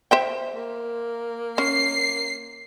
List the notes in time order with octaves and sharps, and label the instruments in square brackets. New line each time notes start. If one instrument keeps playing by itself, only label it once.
[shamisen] C5 E5 G5
[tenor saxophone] A#3
[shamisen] C#4 [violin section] C7